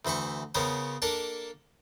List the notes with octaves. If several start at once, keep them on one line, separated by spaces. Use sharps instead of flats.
D2 E3 C5 B5 C#6
C#3 B3 C#4 A#4 C5
A#3 D4 A4 A#4